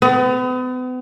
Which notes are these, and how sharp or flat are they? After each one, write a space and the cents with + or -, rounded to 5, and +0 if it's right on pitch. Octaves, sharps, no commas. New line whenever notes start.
B3 +40